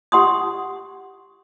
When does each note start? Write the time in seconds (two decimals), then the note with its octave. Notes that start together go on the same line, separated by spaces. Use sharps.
0.12 G4 F#5 C6 D#6